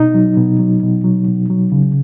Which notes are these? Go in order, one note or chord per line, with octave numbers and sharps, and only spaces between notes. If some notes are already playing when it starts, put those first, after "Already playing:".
Already playing: B2 D#4
F#3
B2
F#3
B2
F#3
B2
F#3
C#3